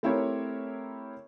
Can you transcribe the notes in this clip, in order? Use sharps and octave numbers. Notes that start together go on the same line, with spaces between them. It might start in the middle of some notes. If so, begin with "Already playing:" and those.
A3 C4 E4 G4 A#4 C#5